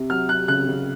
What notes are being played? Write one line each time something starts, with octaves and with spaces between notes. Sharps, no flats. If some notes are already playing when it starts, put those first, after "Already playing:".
Already playing: C3
F#3 F6
F#3 F#6
C#3 F#6
C#3